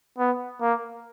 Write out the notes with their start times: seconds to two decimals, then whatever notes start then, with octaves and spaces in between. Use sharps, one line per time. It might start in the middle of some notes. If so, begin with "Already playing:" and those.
0.18 B3
0.61 A#3